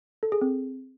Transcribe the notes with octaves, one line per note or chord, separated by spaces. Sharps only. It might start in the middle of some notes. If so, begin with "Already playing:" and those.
A4
G#4
C4